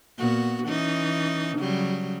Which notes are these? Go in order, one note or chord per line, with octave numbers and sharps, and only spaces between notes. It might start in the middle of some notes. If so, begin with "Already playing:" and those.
A#2 B3 F#4
E3 C#4 D#4
C#3 F#3 G3